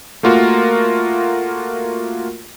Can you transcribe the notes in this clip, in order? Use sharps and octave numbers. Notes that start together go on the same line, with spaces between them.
A3 A#3 F4 F#4 A#4